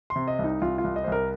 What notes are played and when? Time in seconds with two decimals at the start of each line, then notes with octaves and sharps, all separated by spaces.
0.10 C6
0.16 C3
0.28 D#5
0.39 C2
0.44 D#4
0.62 C2 F4
0.78 F4
0.84 C2
0.96 D#5
1.04 C5
1.07 C2 A#4